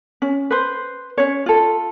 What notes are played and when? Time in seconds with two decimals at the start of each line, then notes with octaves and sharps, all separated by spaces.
0.22 C#4
0.50 B4 C5
1.18 C#4 C#5
1.46 F4 A4